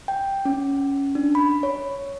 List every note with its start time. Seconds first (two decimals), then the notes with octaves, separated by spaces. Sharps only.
0.08 G5
0.45 C#4
1.15 D4
1.35 B5
1.63 C#5